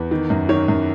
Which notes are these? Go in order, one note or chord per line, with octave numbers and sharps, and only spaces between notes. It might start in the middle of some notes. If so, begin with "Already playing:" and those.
Already playing: E2 B4
D#3
F#2
D#3 C#5
F#2